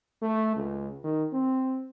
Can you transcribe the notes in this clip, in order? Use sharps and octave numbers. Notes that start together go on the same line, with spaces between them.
A3
C#2
D#3
C4